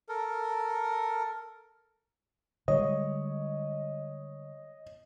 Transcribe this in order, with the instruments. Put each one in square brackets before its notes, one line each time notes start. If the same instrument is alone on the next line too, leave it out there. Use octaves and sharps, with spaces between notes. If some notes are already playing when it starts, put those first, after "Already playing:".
[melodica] A4 A#4
[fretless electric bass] D3 G3 G#3 [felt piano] C#5 [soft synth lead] D#5